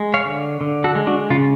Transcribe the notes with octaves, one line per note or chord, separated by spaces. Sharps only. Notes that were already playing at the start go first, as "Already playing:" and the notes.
Already playing: G#3
C#5 F5
D3
D3
F#4 A4
G#3
D4 F#4
C#3 F4